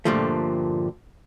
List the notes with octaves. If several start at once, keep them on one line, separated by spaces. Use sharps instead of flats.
G2 A#2 D3 F3 G3 A3